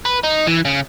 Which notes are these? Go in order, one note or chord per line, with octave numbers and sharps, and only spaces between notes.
B4
D#4
E3
C#3